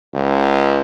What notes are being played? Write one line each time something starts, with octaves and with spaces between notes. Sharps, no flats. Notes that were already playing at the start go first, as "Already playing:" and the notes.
C#2